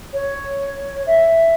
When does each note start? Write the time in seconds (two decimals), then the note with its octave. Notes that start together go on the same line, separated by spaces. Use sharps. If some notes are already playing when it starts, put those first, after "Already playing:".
0.13 C#5
1.06 E5